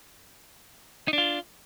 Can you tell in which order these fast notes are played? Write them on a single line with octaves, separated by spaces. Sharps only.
D#4 D4 F4